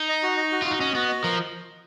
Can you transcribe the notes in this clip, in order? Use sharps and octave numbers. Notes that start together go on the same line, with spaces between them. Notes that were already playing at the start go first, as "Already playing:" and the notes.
Already playing: D#4
D#5
F#4
D#5
F#4
F4
D#4 F#4
C#4 D#5
B3 F#4
D#5
F3 A#4